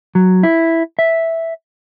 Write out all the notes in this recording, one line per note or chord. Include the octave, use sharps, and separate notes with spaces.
F#3
E4
E5